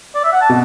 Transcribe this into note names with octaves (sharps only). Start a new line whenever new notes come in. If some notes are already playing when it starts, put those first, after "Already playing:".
D5
E5
F#5
A5
B2